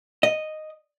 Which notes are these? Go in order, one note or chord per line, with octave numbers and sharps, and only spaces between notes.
D#5